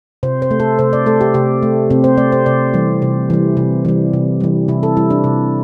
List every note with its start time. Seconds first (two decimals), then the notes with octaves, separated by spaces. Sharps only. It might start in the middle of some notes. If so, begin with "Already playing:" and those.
0.23 C3 C5
0.42 C5
0.51 A3
0.60 A4
0.79 C3 C5
0.93 D5
1.06 A3 A4
1.21 G4
1.34 C3 G4
1.63 A3
1.90 C3 C4
2.04 C5
2.17 A3 D5
2.32 C5
2.46 C3 D5
2.74 E3 G3
3.02 C3
3.30 E3 G3
3.57 C3
3.85 E3 G3
4.13 C3
4.40 E3 G3
4.68 C3 E4
4.83 A4
4.97 G3 E4
5.10 D4
5.24 C3